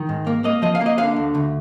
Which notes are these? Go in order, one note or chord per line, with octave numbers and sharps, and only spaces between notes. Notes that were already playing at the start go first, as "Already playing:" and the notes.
Already playing: D#3
G#2
A#3
A#3 D#5
F3 D#5
F5
A#3
D#5
D3 F5
D2
D2